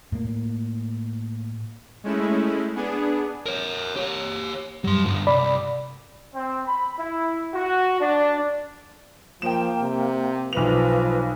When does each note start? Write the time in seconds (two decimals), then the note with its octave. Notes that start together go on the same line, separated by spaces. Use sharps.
0.12 A2 A#3
2.04 G#3 A3 C#4 E4
2.76 B3 D4 G#4
3.46 A#4 C#5
3.96 G4 C#5
4.84 G2 F#3 G3 C6
5.05 G2 D3 G3
5.27 C2 D5 B5
6.35 C4
6.67 B5
6.99 E4
7.54 F#4
8.00 D4
9.42 F3 A#3 G5 E7
9.80 C3
10.53 B1 F3 B4 F7